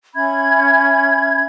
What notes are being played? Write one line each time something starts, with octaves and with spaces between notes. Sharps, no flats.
C#4 E5 B5 G#6